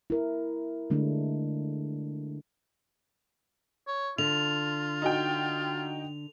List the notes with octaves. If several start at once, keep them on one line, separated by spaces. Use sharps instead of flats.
E4 A#4
D3 G#3 A3 D4
C#5
D3 F4 F7
D#4 F#4 G5